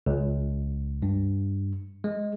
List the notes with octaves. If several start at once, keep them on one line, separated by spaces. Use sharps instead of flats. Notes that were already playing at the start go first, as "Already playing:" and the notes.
C#2
G2
G#3